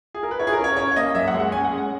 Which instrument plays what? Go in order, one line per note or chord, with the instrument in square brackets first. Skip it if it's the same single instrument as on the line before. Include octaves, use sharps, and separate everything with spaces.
[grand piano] G#4
A#4
B4
[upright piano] E4 [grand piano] C#5
[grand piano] G#4
A#4
[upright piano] C#4
[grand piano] C#5
[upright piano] C#4 [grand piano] C#5
[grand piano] C#5
[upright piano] A#3 [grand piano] D#5
[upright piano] F#2 [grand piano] E5
[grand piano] F#5
[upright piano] G#3
[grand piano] F#5
[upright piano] C#4 [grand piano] G#5
[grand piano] F#5
[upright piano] G#3
[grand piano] F#5